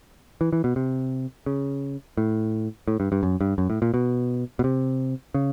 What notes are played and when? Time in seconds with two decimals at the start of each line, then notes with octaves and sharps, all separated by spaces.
0.41 E3
0.53 E3
0.64 B2
0.76 C3
1.46 C#3
2.17 A2
2.88 A2
3.00 G2
3.12 G2
3.23 F#2
3.41 G2
3.58 F#2
3.70 A2
3.82 A#2
3.94 B2
4.59 B2
4.64 C3
5.34 C#3